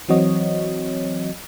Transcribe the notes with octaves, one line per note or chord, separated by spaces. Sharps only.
E3 F#3 C4 F#4 C#5 D#5